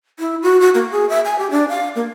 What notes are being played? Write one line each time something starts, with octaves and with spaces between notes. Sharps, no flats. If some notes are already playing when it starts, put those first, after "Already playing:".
E4
F#4
F#4
A#3
G#4
E5
G#5
G4
D4
F5
A#3